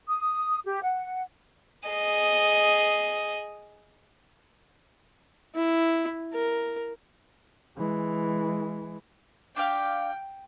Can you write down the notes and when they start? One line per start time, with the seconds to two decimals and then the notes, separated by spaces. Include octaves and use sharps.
0.08 D#6
0.65 G4
0.83 F#5
1.89 G#4 D#5
5.55 E4
6.33 A#4
7.77 E3 G#3
9.56 D4 G4 F5 G5